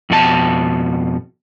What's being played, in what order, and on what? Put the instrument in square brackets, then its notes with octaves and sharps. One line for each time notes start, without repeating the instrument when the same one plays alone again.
[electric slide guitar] F2 B2 E4 A5